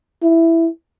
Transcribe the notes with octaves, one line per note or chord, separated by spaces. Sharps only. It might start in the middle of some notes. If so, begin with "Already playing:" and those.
E4